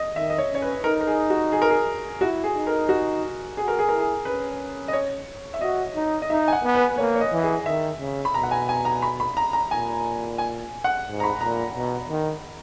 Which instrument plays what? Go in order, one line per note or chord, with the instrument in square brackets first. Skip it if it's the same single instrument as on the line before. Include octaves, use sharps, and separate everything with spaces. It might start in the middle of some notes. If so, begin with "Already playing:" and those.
Already playing: [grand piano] D#5
[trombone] D#3 [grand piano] E5
[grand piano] D#5
C#5
[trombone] C#4 [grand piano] C#5
[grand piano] B4
[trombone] D#4 [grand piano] A#4
[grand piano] A#4
G#4
F#4
G#4
A#4
G#4
[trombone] E4 [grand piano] F#4
[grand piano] G#4
[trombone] D#4
[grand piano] A#4
F#4
[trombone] F#4 [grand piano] G#4
[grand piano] A#4
G#4
[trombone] E4 [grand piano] A#4
[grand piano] G#4
[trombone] C#4 [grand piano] B4
[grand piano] D#5
C#5
E5
[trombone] F#4 [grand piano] D#5
[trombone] D#4
[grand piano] D#5
[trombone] D#4 [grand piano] E5
[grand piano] G#5
F#5
[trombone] B3
[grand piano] B4
[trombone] A#3 [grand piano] C#5
[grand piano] C#5
D#5
[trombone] E3
[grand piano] G#4
[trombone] D#3 [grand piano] E5
[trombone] C#3
[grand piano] B5
[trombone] B2 [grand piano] A#5
[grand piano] F#5
G#5
G#5
A#5
B5
B5
A#5
A#5
[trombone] A#2 [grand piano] G#5
[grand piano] G#5
F#5
[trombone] G#2
[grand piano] A#5
B5
[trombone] A#2 [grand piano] A#5
[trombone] B2
D#3